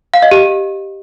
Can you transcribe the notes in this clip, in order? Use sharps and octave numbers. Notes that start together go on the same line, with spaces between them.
F5
D#5
G4